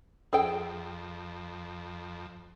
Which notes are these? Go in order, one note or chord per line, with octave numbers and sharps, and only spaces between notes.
F2 G#4 A4 G5